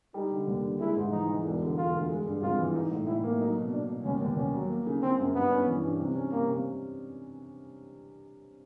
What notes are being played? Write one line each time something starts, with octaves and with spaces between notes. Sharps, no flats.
G3 D#4
D3
D#2
D3
G#3 E4
G#2
E3 D#4
E3
E1
D3
E1 F4
D2
G#3
G2
G#1 F4
E3
D#4
A2
A2 E4
A#3
F#3 D#4
B2
B2 D4
B2
D#2 C#4
D#2
D#2 C#4
F#3
A#3
C#3
C#3 C4
F#2
G2 B3
C#4
E3
G2
C3
C#4
C3 A#3
C3